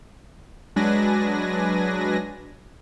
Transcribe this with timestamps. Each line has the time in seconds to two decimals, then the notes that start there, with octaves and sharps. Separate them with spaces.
0.76 F#3 G#3 D4 B4 G#5 A#6